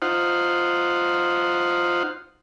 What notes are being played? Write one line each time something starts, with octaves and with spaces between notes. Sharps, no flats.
D#4 F4 C5 F#5